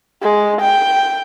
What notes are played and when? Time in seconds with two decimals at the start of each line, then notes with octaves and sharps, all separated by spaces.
0.23 G#3
0.61 G5